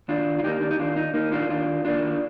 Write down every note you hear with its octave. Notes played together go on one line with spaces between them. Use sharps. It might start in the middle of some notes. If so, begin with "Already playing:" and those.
D#2 D4 F4
F4
D#3 A#3 D#4 G4
D4
D#4
D#2 D4 F4
D#4
D#3 A#3 D#4
D4 F4
D#2 D4 F4
D#3 A#3 D4 F4